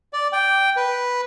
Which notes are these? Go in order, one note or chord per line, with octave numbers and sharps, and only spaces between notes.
D5
G5
B4